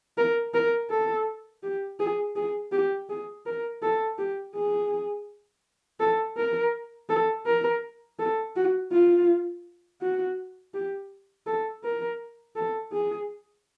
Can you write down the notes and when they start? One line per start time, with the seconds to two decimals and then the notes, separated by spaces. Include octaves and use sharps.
0.18 A#4
0.54 A#4
0.90 A4
1.63 G4
2.00 G#4
2.36 G#4
2.72 G4
3.09 G#4
3.46 A#4
3.82 A4
4.18 G4
4.55 G#4
6.00 A4
6.37 A#4
7.09 A4
7.46 A#4
8.19 A4
8.56 F#4
8.92 F4
10.01 F#4
10.74 G4
11.47 A4
11.84 A#4
12.56 A4
12.92 G#4